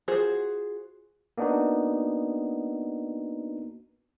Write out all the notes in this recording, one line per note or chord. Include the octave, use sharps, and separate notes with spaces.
F4 F#4 G#4 C5
A#3 B3 D4 D#4 F#4